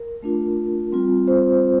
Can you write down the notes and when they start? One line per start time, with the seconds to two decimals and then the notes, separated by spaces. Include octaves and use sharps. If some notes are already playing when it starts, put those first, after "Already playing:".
Already playing: A#4
0.23 A3 D4 F4
0.92 G3 C4 F4
1.28 C5